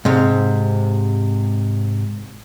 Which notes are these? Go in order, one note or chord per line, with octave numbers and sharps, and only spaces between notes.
G#2 C3